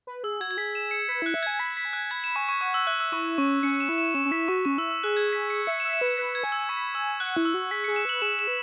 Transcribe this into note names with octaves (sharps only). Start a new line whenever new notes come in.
B4
G#4 E6
F#4 G#6
G#6
G#4 B6
E7
C#7
B4 B6
E4 F#6
E5
G#5 G#6
B5 B6
B6
G#5
F#6
B5 G#6
E7
G#5 C#6
C#6
F#5 C#6
E6
E5 F#6
E6
E4 C#6
C#4 C#6
C#4 C#7
E7
E4
E7
C#4 E7
C#4
E4 B6
F#4 C#6
C#4 C#6
E4 E6
E6
G#4 F#6
G#6
B6
C#7
E5 C#7
E7
E5
E7
B4 C#7
B4 B6
G#6
G#5
E6
B5 C#6
G#5 E6
F#5 F#6
E4
E6
F#4
G#4 B6
G#4 C#7
E7
B4 F#7
G#4 E7
E7
B4